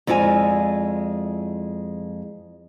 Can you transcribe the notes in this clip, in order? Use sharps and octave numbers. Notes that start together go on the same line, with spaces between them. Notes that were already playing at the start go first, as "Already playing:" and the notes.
F2 G#3 E4 F4 D5 G#5